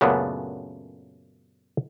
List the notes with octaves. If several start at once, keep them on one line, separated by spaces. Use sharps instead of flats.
F#2 A#2 C#3 A3 B3 D4